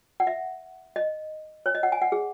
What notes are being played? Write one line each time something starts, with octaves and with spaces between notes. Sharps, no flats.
F#5
E5
D#5
C#5
D#5
F#5
G#5
F#5
G#4